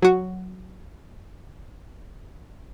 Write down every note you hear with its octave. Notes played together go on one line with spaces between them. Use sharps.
F#3 F#4